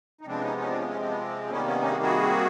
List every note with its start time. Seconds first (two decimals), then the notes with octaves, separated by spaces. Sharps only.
0.21 D#4
0.26 C3 F3 G#3 B3 C4 D4
0.42 C#4 D#4
0.58 C#4 D#4
0.67 C4 D4
0.78 B3 C#4
0.88 C#4
0.99 C4
1.09 B3
1.19 C4
1.50 C3 D#3 G3 A#3 B3 C#4
1.66 B3 C#4
1.81 C#4 D#4
1.92 F#4 G#4
2.02 F#4 G#4